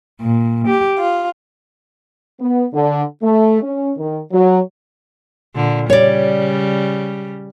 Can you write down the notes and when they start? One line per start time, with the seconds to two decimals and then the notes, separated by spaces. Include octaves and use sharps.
0.21 A#2
0.67 G4
0.98 F4
2.40 B3
2.73 D3
3.22 A3
3.62 C#4
3.97 D#3
4.32 F#3
5.55 A#2 D3
5.90 C#3 G3 C#5 D5